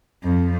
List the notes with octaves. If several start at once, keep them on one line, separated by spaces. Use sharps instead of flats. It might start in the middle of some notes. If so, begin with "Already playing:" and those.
F2